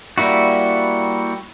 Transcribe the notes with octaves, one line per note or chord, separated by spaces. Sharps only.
G3 A#3 E4 F#4